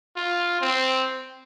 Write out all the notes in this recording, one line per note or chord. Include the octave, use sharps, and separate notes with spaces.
F4
C4